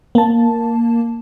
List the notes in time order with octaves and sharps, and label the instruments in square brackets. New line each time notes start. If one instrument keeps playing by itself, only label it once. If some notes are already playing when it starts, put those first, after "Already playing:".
[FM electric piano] A#3 A5